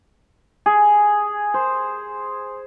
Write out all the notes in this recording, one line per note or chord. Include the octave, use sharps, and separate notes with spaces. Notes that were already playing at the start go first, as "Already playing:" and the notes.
G#4
C5